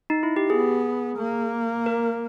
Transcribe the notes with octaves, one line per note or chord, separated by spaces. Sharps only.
D#4
E4
G4
B3 G#4
A#3
A#4